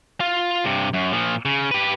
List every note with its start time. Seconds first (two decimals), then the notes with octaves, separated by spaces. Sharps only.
0.20 F4 F5
0.64 G2 C3
0.94 F#2
1.12 A#2 F3
1.45 C#3
1.71 G4 B4